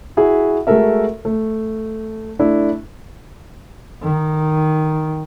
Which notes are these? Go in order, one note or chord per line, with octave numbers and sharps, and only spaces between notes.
E4 F#4 G#4 E5
G#3 A3 F#4 A4 A#4 E5
A3
A3 D4 E4
D#3